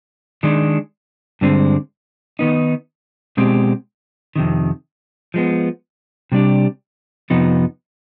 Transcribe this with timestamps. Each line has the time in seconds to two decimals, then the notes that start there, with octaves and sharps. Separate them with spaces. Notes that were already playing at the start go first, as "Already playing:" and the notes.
0.43 D#3 G#3 D4
1.41 G2 D3 G#3 C4
2.39 D#3 B3 D#4
3.37 B2 G#3 C4 G4
4.36 F2 C3 D#3
5.34 F3 G#3 B3
6.32 C3 G3 D4 G4
7.30 F2 C3 F3 B3 D#4